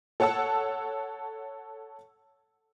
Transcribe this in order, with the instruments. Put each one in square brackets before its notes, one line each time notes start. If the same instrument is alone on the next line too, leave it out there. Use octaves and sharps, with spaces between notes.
[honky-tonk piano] A4 C#5 F#5 A5 E6